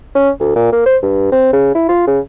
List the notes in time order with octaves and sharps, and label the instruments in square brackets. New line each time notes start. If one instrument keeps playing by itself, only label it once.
[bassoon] C#4
D2
A#2
A#3
C5
G2
C4
C#3
E4
F4
C#3